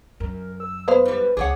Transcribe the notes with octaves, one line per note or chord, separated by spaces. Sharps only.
F#2 A#4
E6
B3 B4 C5 F5
G#2 G3
C#2 G#4 C#5 F#5 D6